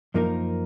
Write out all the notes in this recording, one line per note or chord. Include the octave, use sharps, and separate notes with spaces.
F#2 F3 A#3 D#4 A#4